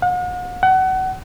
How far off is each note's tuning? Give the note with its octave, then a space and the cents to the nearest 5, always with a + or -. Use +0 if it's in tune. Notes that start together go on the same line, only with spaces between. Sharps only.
F#5 -40
F#5 +30